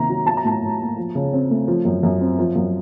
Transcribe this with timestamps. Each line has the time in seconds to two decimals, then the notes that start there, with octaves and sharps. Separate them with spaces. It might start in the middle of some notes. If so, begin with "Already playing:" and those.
Already playing: C3 D#3 A#3 A#5
0.09 F#3
0.26 F#3 A5
0.37 A#5
0.44 A2 A5
0.62 A2
0.79 A#3
0.97 F3
1.15 C#3
1.33 C4
1.50 A3
1.68 F3
1.85 F#2
2.03 F#2
2.21 C4
2.38 F3
2.56 F#2